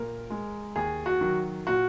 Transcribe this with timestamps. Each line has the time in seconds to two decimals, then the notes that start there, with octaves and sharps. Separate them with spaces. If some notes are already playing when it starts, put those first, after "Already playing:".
Already playing: A#2 A#4
0.30 G#3
0.76 D#2 G#4
1.06 F#4
1.21 D#3 F#3
1.67 A#2 F#4